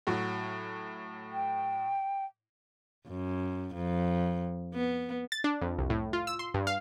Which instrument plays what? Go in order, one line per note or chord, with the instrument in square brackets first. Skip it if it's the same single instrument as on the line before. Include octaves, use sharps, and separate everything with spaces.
[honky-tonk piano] A2 F#3
[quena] G5
[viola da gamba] F#2
F2
B3
[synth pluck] A6
D4
F2
C2
A2
F4
E6
C6
G2
F5